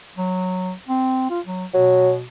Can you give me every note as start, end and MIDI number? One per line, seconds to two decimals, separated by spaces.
0.17 0.72 54
0.88 1.26 60
1.30 1.40 65
1.46 1.65 54
1.74 2.24 47
1.74 2.12 54